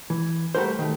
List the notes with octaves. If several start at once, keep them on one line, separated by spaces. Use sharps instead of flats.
E3
G3 A3 F#4 A#4 C5
D#3 A3